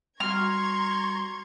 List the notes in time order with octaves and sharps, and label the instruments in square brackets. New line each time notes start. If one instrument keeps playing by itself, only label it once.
[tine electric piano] G3 F#4 [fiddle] A#5 C6 [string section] C#6 G#6 [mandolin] F6